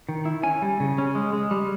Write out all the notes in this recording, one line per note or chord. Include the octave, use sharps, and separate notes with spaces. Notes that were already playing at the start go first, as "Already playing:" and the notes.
D#3
E4
C#4 G#5
G3
C#3
C#4
G#3
G#3
G3